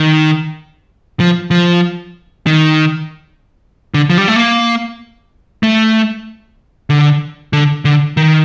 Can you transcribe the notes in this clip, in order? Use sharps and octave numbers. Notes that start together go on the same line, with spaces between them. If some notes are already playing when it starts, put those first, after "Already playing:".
Already playing: D#3
F3
F3
D#3
D3
F3
G3
A3
A#3
A3
D3
D3
D3
D#3